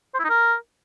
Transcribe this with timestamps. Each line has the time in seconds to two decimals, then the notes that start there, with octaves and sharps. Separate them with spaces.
0.14 C5
0.19 E4
0.24 D#4
0.29 A#4